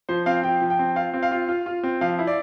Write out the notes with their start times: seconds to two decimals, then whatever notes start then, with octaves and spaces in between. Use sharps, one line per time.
0.09 F3 C5
0.26 C4 F5
0.44 F3 G5
0.62 F3
0.70 G5
0.79 C4
0.96 F4 F5
1.14 C4
1.23 F5
1.31 F4
1.49 F4
1.66 F4
1.83 C4
2.01 F3 F5
2.19 E4
2.27 D5